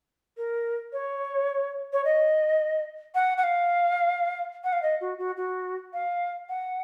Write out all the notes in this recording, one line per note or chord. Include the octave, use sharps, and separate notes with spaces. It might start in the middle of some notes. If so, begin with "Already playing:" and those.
A#4
C#5
C#5
D#5
F#5
F#5
F5
F#5
F5
D#5
F#4
F#4
F#4
F5
F#5